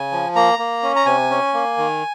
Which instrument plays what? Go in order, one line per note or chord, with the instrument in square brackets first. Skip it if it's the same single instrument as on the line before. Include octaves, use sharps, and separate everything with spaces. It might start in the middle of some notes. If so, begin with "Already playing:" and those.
Already playing: [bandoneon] C#3 G#5
F3
A#3 A#5
A#3
C#4
A#5
C3 G#5
C#4
A#3
D#3